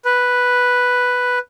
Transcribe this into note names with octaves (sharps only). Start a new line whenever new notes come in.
B4